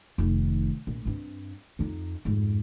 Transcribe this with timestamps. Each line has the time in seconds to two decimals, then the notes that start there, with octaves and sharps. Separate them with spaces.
0.18 F1 D#3
0.87 A#1
1.05 G2 C4
1.79 F2 D#4
2.25 F2 G#2